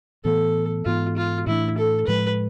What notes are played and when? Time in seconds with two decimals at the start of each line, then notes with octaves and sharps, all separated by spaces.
0.24 A2 E3 B3 A4
0.85 G#2 E3 B3 F4
1.17 F4
1.47 A2 E3 A3 D4 E4
1.78 A4
2.07 A2 F3 G#3 B4